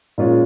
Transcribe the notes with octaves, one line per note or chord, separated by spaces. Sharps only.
A#2 G#3 C#4 F4